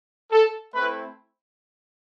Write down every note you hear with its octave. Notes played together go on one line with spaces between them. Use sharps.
A4
A3 C4 E4 B4